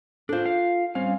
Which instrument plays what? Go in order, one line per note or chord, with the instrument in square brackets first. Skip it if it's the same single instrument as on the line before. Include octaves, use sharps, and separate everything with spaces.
[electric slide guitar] D4 C5 [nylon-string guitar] F4 A4
[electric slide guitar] F5
[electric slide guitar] G3 C#4 F5 [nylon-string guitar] C4